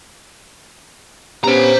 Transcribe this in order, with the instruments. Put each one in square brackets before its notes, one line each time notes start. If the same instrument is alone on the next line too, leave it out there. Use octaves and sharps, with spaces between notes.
[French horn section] B3 C#4 G4 [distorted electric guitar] C5 A#5